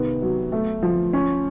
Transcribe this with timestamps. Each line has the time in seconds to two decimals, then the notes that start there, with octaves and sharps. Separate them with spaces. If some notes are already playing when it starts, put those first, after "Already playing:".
Already playing: C3 D#3 B3
0.22 F#3
0.52 A3
0.82 F3
1.13 C#4